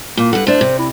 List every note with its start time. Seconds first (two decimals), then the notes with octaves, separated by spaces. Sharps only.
0.17 A#2 A#3
0.33 G2 A4 F#5
0.47 A3 D4 C5
0.61 C3
0.78 E4